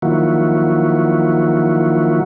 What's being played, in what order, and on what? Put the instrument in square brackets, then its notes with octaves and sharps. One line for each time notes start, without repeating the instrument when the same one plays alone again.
[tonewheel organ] D#3 F3 F#3 A#3 E4 F#4